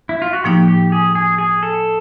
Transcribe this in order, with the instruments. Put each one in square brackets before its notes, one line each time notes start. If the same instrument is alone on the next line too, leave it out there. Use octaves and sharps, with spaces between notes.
[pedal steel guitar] E4
F4
F#4
[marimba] A2 F3 A#3 D#4 [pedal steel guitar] G4
[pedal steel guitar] G4
G#4
G#4
G#4
A4